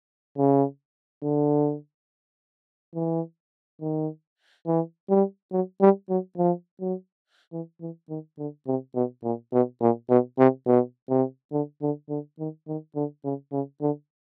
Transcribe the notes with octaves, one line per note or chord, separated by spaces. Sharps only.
C#3
D3
E3
D#3
E3
G3
F#3
G3
F#3
F3
F#3
E3
E3
D#3
D3
C3
B2
A#2
B2
A#2
B2
C3
B2
C3
D3
D3
D3
D#3
D#3
D3
C#3
C#3
D3